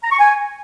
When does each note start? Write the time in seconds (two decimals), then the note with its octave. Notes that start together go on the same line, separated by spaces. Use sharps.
0.04 A#5
0.12 C#6
0.19 G#5